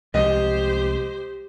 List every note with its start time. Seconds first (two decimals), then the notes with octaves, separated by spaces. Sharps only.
0.14 C2 F3 G#3 G4 C5 D#5